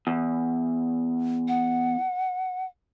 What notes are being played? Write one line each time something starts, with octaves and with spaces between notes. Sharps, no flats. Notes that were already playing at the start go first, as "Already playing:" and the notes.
E2
F#5